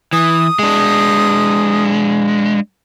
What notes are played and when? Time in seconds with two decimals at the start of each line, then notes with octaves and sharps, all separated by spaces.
0.13 E3 D#6
0.59 G#3 D4